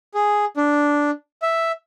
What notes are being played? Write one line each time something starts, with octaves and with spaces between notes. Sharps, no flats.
G#4
D4
E5